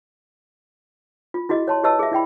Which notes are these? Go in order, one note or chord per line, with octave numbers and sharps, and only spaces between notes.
F4
E4 F#4 G#4 D#5
C#5 A5 C6
G4 B4 C#5 D#5 A5 E6
G#4 E5
E4 D5 G5 B5